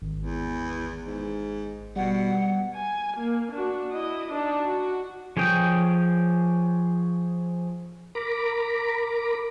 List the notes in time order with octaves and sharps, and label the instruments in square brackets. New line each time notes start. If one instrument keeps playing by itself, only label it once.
[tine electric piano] G#1
[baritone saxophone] E2
G#2
[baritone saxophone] B2 [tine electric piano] G3 [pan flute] F#5
[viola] G#5
A#3
D4 F#4
E4 D#5
D4 D#4
F#4
[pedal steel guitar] F3 G#4 C#5 G5 D#6
[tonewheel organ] A#4 A#5 B5 D6